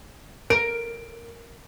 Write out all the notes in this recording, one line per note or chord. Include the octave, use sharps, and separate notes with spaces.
A#4 D7